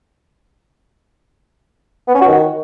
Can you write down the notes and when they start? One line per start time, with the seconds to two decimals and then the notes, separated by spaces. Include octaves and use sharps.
2.08 B3
2.14 C#4
2.21 F#4
2.28 D#3